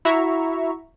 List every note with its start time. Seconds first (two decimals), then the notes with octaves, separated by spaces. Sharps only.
0.05 E4 F#4 E5 A#5 C#6